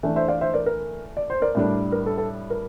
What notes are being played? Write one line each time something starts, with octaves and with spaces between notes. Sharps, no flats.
E3 A3 D4
C5 E5
D5 F5
C5 E5
A#4 D5
A#4
D5
C5
A#4 D5
A2 G3 D4
A#4
A4
A4
A#4